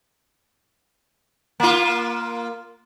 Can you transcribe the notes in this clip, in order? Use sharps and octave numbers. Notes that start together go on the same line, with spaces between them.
A#3 F4